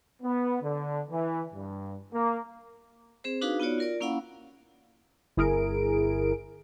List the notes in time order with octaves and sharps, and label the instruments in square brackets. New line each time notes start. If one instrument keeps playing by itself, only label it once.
[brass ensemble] B3
D3
E3
G2
A#3
[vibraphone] C4 G#4 C5
D4 D#4 F#4 G#4 B4 F5
B3 D#4 F4 F#4 C#5 D5
F4 A#4 D5
A#3 C#4 E4 F5 F#5 B5
[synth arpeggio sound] G1 E4 G#4 A#4 D7